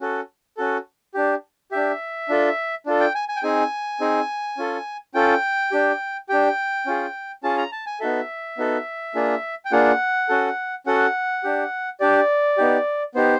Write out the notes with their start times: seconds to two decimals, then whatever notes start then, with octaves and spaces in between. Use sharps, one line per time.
0.01 C#4 F#4 A4
0.57 C#4 F#4 A4
1.14 D4 G4
1.71 D4 G4 E5
2.29 D4 F4 A4
2.86 D4 F4 A4
3.00 G5
3.15 G#5
3.29 G#5
3.36 G5
3.43 C4 D#4 G#4 G#5
4.00 C4 D#4 G#4
4.57 C#4 F4 A4
5.14 C#4 F4 A4 G5
5.72 D4 G4
6.29 D4 G4 G5
6.86 C#4 F4 G#4
7.43 C#4 F4 G#4 A5
7.57 A#5
7.72 A5
7.86 G#5
8.00 B3 D#4 F#4 A4 E5
8.58 B3 D#4 F#4 A4
9.15 A#3 D4 F4 G#4
9.65 G5
9.72 A#3 D4 F4 G#4 F#5
10.29 C#4 F#4 A4
10.86 C#4 F#4 A4 F#5
11.44 D4 G4
12.00 D4 G4 D5
12.58 B3 D#4 G4
13.15 B3 D#4 G4 C5